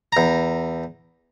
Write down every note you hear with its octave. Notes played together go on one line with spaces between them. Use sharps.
E2 A#5